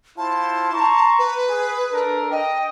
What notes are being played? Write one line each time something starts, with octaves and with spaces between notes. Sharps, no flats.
E4 F4 C5 A5
A#5 C6 C#6
B4
G#4
D4 A4 A#4
D#5 G5